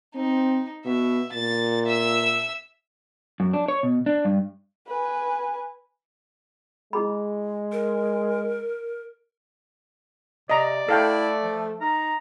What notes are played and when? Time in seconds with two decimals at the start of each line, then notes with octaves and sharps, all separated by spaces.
0.15 C4 D#4
0.85 B2 E5
1.33 A#2 A6
1.86 E5 E6
3.40 F#2
3.54 D4
3.68 C#5
3.83 B2
4.06 D4
4.25 G2
4.88 B4 G#5
6.93 G#3 E4 G#4 B5
7.72 A#4
10.50 C3 D5 D#5 A#5
10.89 A3 E4 A4 F5 G5
11.42 F3
11.81 D#4 A#5